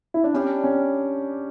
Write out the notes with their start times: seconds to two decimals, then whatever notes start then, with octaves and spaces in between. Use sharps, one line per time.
0.14 E4
0.24 D4
0.34 G3 C#4 D4 G4
0.64 C#4